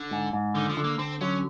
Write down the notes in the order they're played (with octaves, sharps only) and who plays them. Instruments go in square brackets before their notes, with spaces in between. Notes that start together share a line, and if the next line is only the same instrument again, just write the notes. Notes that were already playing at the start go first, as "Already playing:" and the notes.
Already playing: [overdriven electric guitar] D3
[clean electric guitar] G#2
G#2
[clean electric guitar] D3 [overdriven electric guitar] D#3
[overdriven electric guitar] F3
[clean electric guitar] D3
[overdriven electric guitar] A#3
[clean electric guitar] D3 [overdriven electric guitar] C4
[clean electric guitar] F#3 [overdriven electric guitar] C#4